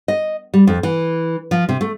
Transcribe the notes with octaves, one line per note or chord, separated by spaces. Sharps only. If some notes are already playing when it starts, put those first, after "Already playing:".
D#5
G3
F2
E3
F3
C3
A3